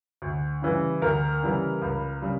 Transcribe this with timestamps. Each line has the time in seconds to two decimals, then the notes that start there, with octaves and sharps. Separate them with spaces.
0.22 D2
0.62 C#3 E3 G3
1.02 D2 A#4
1.43 C#3 E3 G3
1.82 C#2
2.22 C#3 G3